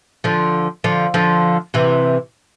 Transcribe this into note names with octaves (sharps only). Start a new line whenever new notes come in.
D3 F3
D3 F3
D3 F3
C3 E3